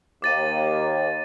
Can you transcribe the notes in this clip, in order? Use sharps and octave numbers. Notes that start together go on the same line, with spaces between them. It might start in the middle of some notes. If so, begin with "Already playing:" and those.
D#2 D6 A6 D#7